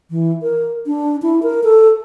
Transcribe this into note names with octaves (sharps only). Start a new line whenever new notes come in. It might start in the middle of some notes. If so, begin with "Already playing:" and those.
E3
A#4
D4
E4
A#4
A4